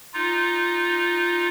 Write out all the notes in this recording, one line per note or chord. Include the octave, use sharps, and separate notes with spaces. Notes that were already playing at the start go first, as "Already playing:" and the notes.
D#4 F4